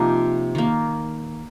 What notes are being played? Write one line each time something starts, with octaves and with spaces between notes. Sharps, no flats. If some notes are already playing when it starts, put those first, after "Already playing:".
Already playing: C3 F3 A#3 D#4
D#3 A#3